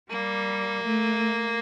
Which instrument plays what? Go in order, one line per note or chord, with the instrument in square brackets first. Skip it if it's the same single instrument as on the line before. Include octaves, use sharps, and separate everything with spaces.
[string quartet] G3 [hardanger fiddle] A#3
[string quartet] A3